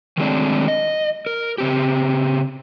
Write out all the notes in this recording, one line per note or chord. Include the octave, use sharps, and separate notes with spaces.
D#3 F#3 G#3 A3 C4 D4
D#5
A#4
C#3 C4 G4